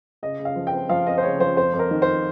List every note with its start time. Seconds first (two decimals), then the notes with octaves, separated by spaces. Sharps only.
0.23 C#3 D#5
0.39 C#3
0.45 F5
0.56 F3
0.67 G5
0.73 C4
0.89 F3 F5
1.07 C4 D#5
1.18 C5
1.23 C#3 C#5
1.40 F3 C5
1.57 F2 C5
1.74 F2
1.79 A#4
1.91 D#3
2.02 C5